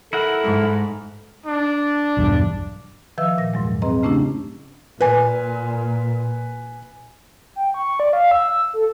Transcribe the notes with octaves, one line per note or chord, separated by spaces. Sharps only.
E4 A4 A#4 F#5
G#2
D4
B1 E2 G2
D#3 F3 B4 E5 F5 E6
A#2 A#6
E2 G#2 F#3 G#3
C4 G#4 B4 D#5 A#5
C#3 A3 C#4 D4 E4 G4
A#2 B4 G#5
G5
C#6
D5
F5
E6
A4